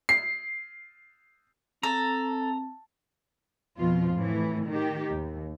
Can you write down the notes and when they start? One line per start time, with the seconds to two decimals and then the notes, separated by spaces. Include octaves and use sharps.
0.09 C7
1.83 C4 A4 A#5
3.77 F2 B2 F3 F4
4.16 A2 E3
4.69 D#3 G4
5.12 D#2